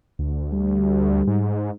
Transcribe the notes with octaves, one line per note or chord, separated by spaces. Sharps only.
D2
G3
G#2